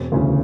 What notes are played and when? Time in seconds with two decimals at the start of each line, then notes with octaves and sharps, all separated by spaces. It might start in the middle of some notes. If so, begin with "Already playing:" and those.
Already playing: E1 C4
0.12 D2 C#3 E3